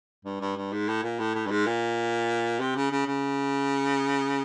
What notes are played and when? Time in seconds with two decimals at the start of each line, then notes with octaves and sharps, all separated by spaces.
0.25 G2
0.41 G2
0.57 G2
0.72 G#2
0.88 A2
1.03 A#2
1.19 A2
1.35 A2
1.46 G2
1.51 G#2
1.66 A#2
2.60 C3
2.76 C#3
2.91 C#3
3.07 C#3